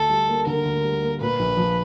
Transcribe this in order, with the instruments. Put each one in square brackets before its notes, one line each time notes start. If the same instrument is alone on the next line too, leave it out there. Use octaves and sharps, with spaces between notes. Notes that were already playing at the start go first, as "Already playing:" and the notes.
Already playing: [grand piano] D2 D3 [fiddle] A4
[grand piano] G3
A#3
[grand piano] D3 [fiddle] A#4
[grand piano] D2
G3
A#3
[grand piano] A#2 [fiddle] B4
[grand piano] A#1
F3